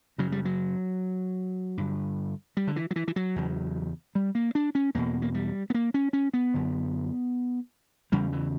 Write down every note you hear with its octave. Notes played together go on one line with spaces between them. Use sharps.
F#2 C#3 F#3
G3
F#3
G2 D3
G3
D3
E3
F#3
E3
E3
F#3
E2 C#3
G3
A#3
D4
C#4
E2 B2 A#3
A#3
G3
B3
A#3
C#4
C#4
B3
F#2 D3
E2 C#3 G3
E3